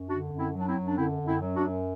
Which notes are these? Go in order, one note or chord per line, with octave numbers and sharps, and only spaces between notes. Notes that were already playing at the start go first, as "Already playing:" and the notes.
Already playing: F#2
D3 D4 F#4
F#2
C4 E4
F#3
D4
C4 E4
F#2
D4
D3 C4 E4
F#2
C4 E4
F#3
D4 F#4
F#2